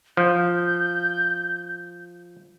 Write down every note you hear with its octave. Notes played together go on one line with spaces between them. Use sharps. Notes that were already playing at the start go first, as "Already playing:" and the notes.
F3 G6